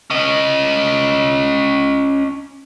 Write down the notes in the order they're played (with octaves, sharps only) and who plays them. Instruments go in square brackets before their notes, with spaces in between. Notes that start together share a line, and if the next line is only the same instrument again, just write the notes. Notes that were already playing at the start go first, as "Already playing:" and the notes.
[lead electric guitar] C#4 D#5